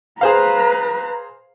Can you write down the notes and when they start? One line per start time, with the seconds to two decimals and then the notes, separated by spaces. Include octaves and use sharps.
0.21 G#4 B4 C5 F5 A#5